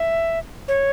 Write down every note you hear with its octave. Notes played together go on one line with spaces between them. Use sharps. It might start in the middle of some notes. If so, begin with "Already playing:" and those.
Already playing: E5
C#5